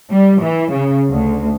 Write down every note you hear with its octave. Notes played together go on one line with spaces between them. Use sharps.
G3
E3
C#3
D2